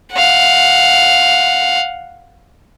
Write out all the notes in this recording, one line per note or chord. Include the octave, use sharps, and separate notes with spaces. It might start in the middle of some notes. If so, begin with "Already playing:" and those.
F5 F#5